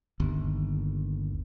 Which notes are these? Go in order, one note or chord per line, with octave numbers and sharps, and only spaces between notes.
G1 D#2